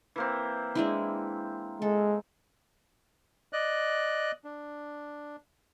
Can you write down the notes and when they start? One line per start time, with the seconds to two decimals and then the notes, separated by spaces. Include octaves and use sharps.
0.16 E3 A#3 C4
0.75 G#3 D4 E4
1.82 G#3 A4
3.53 D5 D#5 F#6
4.44 D4